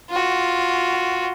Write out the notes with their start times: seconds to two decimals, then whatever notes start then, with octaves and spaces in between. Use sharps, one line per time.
0.11 F4 F#4